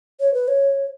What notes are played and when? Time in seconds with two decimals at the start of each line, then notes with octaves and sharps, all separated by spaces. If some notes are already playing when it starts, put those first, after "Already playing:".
0.20 C#5
0.34 B4
0.48 C#5